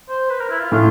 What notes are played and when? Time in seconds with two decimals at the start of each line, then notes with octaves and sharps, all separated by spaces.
0.09 C5
0.30 B4
0.40 A#4
0.50 E4
0.60 F4
0.71 A2 F4